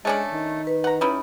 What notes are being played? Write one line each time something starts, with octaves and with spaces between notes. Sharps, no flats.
G#3 A3 C#4 D4
D#3
B4
F#5 A#5
G3 C#4 D#4 E4